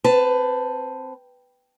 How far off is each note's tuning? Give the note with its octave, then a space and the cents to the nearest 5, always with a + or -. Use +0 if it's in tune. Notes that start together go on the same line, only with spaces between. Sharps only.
C4 +0 B4 +20 A5 +0